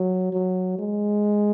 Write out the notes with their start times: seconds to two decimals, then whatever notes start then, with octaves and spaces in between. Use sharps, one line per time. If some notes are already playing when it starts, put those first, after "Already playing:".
Already playing: F#3
0.33 F#3
0.79 G#3